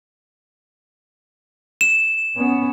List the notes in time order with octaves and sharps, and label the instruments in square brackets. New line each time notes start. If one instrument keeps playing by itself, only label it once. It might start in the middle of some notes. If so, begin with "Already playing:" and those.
[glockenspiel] E7
[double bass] B3 C#4